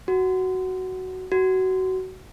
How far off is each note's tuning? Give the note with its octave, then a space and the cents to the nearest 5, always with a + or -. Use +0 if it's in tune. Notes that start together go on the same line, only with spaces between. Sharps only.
F#4 +10
F#4 +20